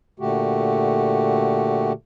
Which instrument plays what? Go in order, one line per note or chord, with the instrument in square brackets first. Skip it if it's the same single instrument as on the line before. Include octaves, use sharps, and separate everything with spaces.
[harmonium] A#2 D3 A3 F#4 G4